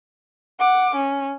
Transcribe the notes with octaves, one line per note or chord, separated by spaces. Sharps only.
F#5 D6
C#4